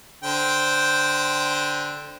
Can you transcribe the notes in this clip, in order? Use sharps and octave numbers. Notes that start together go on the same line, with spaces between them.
D3 C5 G5